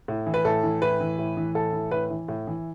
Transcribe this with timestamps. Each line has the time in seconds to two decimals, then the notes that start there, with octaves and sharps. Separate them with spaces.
0.08 A2
0.27 E3
0.34 B4
0.45 A2 A4
0.63 E3
0.82 A2 B4
1.00 E3
1.19 A2
1.37 E3
1.55 A2 A4
1.73 E3
1.91 A2 B4
2.10 E3
2.28 A2
2.47 E3